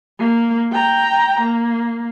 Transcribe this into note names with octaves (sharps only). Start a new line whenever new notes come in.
A#3
G5 A#5
A#3